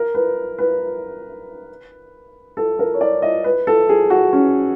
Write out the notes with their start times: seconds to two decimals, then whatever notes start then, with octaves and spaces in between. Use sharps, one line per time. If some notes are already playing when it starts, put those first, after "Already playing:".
Already playing: A#4
0.15 B4
0.59 B4
2.57 A4
2.79 A#4
2.94 C#5
3.01 D5
3.22 D#5
3.44 B4
3.67 A4
3.89 G#4
4.10 F#4
4.33 C#4